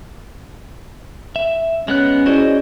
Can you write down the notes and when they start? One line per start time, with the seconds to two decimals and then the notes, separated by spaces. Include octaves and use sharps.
1.36 E5
1.88 G#3 B3 C#4 F#6
2.26 E4 F#4 G#4 C5 D5 D#5